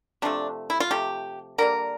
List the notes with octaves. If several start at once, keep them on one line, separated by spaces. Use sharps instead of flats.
C3 F3 A3 D4
E4
F4
C3 F3 A3 G4
D3 G3 A#3 A#4